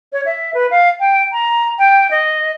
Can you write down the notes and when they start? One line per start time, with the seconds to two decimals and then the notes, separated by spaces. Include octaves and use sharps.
0.13 C#5
0.26 E5
0.54 B4
0.71 F5
1.00 G5
1.32 A#5
1.79 G5
2.11 D#5